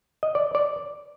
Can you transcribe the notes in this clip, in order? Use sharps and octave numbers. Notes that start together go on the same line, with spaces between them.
D#5
D5
D5